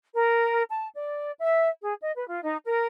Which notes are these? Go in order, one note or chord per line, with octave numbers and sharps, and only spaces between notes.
A#4
A5
D5
E5
G#4
D#5
B4
F4
D#4
A#4